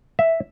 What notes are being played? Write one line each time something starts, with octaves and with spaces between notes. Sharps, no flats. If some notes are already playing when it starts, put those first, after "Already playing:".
E5